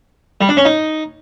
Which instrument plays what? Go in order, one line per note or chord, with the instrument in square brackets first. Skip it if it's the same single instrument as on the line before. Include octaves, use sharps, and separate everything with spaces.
[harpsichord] G3
D4
C#4
D#4